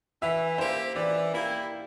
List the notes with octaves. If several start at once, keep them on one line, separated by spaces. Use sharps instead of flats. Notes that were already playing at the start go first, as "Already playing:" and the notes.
E3 E5
A#3 E4 G4 C5
E3 D5
A#3 E4 G4